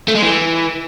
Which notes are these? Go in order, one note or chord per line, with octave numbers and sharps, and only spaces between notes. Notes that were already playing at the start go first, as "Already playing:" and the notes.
A3
G#3
E3